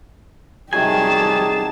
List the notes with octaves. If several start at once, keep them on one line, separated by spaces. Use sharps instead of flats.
C3 D#3 F#3 G3 G4 G#4 G#5 A5